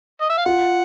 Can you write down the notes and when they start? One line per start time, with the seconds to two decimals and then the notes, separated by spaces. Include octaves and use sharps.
0.21 D#5
0.30 E5
0.37 F5
0.46 F4 F#5